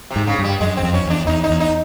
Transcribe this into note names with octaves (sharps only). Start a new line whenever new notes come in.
C3
G#2
C#3
G2
G3
F#2 G#3
C4
F2
C#4
E2 D4
E2 D#4
D#4
E2
D#4